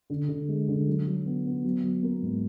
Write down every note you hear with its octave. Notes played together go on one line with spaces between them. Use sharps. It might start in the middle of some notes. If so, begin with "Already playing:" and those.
D3
D3
G#3
D3
F#3
F#3
B3
B3
F#3
F#3
A#3
G#2